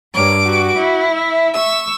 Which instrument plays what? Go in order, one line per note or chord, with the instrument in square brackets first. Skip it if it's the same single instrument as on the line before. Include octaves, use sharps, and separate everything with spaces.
[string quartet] G2 D6 [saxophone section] A#3 C#5
[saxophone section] F#4
[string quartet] E4
[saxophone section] E5
[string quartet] C#6 E6